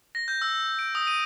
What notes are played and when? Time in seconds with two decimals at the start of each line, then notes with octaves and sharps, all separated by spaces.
0.15 A#6
0.28 G6
0.42 E6
0.79 D7
0.95 D#6
1.07 D#7